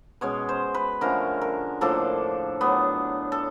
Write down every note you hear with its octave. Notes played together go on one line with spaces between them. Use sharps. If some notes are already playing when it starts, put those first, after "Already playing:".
B2 G#3 C#4 C#5
C5
B4
D3 F3 A3 C#4 A#4
A#4
A2 F3 A#3 D4 A4
A2 F#3 B3
A4